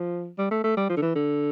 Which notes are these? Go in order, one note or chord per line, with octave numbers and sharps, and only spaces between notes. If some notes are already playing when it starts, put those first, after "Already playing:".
Already playing: F3
G3
A3
A3
G3
F3
D3
E3
D3